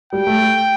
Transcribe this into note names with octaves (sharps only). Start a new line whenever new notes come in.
G3 G5
A3